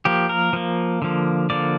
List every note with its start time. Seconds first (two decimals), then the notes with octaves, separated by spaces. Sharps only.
0.05 F3 A#3 G4
0.29 A#4
0.53 F3 A#3
1.02 D3 F3 A#3
1.50 D3 F3 A#3 D5